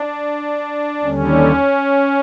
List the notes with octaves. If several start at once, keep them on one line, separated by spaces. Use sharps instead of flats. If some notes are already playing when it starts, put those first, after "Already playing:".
Already playing: D4
D#2 D3 G3 C#4